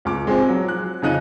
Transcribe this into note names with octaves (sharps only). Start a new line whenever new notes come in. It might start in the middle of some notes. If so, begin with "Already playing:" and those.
C#2 D6
A#2 G#3 C4
F3 F#3
F#6
F2 C#3 D#4 F#6 D#7